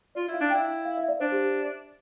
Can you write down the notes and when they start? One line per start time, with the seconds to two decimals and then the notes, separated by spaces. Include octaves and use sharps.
0.15 F4 D5
0.28 E4
0.33 F5
0.41 D4
0.50 E4 G5
0.85 F5
0.98 E5
1.08 D5
1.20 D4 C5
1.32 G4
1.44 G4